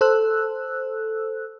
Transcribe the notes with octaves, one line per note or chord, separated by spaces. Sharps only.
A4 C5 E6 F#6